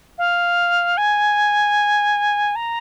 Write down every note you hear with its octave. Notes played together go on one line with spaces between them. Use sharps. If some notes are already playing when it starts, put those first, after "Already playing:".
F5
G#5
A#5